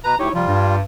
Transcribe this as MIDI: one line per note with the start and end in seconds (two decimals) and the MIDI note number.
0.04 0.15 47
0.04 0.15 71
0.04 0.18 82
0.19 0.29 38
0.19 0.30 63
0.19 0.30 64
0.19 0.29 67
0.19 0.30 73
0.34 0.44 48
0.34 0.44 53
0.34 0.76 55
0.34 0.76 65
0.48 0.81 43